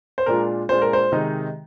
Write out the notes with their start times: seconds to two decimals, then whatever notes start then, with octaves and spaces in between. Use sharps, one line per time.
0.18 C5
0.26 A#2 G#3 D4 F4 A#4
0.69 A#2 G#3 D4 F4 C5
0.82 A#4
0.93 C5
1.12 C3 D#3 G#3 D#4